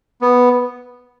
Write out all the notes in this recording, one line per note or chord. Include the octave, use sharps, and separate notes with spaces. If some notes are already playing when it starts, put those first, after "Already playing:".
B3